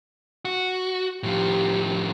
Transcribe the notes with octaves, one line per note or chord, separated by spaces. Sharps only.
F#4
A2 F3 G4